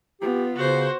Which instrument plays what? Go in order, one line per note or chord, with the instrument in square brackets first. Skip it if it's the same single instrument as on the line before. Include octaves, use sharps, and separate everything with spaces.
[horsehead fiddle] B3 F4 [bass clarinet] G4
[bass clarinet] C#3 [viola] F#4 C5